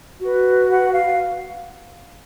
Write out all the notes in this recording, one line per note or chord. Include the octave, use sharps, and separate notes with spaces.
F#4 B4
F#5
F5